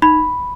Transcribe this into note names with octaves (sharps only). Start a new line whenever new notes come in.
D#4 B5